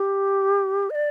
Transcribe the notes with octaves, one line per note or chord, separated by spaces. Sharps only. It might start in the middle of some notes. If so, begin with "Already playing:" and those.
Already playing: G4
D#5
D5